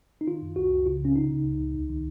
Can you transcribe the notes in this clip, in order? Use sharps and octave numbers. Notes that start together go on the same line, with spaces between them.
D#4
D#3 F4
F#2
C#2 F#4
C#2
C#3 F4
C#3 C#4
C#3 D#4
C#3
C#2
C#2
D#2
D#3